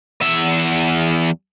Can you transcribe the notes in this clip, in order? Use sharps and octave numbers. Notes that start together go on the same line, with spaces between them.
E2 E5